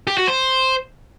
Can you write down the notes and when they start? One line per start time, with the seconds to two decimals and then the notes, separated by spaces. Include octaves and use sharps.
0.07 G4
0.17 F#4
0.28 C5